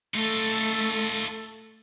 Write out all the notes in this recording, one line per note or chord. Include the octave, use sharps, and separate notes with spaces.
A3 D#4 F4 A4